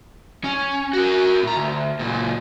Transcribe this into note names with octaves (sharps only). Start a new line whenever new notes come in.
C#4
F#4 A#4
A2 A#5
D2
C#2 A#2